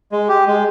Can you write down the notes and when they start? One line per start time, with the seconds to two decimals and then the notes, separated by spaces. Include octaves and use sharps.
0.12 G#3
0.28 G4
0.47 G#3